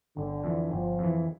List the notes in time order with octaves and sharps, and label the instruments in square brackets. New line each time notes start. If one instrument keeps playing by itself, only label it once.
[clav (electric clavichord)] G1 [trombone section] D3
[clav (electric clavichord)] F2 E3
[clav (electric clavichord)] G1 [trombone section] F3
[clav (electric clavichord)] F2 E3